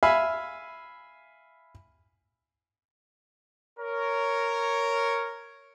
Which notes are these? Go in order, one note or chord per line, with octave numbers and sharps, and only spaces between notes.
E5 F5 G#5 B5
A#4 C#5